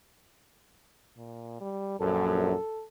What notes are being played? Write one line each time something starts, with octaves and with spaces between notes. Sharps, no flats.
A#2
G3
A#1 F#2 A4